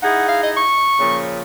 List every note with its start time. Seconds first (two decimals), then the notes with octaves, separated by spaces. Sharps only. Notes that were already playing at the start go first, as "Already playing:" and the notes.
0.02 D#4 E4 G#4 F#5
0.28 F5
0.43 D#5
0.57 C#6
0.98 A#2 C#3 F3